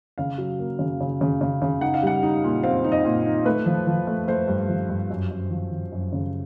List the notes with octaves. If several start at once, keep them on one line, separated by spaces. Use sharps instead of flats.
C#3 F5
F#3
A#3
C#3
C#3
C#3
C#3
C#3
D#4 F#5
F5
G3 F#5
D#4
A#2
C4 F5
D#4
D#5
A#2
D#4
A3 B4
F3
F3
A3
A3 C5
G2
F3
G2
F#2
F#2
F3
F3
F#2
C#3